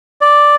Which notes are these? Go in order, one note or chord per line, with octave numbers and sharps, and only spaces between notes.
D5